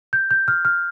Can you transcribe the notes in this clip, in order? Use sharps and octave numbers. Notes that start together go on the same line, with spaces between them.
G6
G6
F6
F6